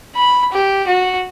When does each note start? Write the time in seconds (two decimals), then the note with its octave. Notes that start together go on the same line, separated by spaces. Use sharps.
0.16 B5
0.52 G4
0.87 F#4